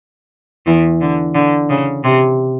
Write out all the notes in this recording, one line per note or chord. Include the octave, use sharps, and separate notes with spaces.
E2 E3
D3
D3
C#3
C3